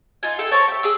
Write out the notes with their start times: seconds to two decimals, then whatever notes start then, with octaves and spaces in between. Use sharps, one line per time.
0.23 D#4 F4 G#5
0.39 A4 E5 G5
0.51 A#4 C5 C#5 A5
0.68 G4 E5
0.83 G#4 D6 E6